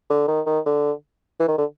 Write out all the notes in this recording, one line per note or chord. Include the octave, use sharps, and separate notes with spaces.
D3
D#3
D#3
D3
E3
D#3
D3